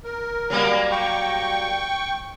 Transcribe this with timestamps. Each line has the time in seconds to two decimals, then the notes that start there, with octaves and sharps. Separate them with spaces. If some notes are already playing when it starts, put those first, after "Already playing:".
0.04 A#4
0.50 F#3 G3 A#3
0.91 G5 C#6